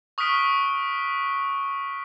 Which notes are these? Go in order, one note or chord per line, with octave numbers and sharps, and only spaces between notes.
C#6 D#6 F6 F#6 B6 D7